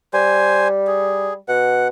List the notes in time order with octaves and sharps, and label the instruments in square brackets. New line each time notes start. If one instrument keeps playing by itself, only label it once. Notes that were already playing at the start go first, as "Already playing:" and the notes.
[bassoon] G3 [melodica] C5 G#5
[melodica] G#4
[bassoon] B2 [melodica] F#5